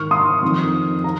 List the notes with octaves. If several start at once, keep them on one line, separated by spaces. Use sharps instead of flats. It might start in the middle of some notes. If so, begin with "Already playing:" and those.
Already playing: G#2 D#3 C#6 F6
C6 D#6
F2 D#3
A#5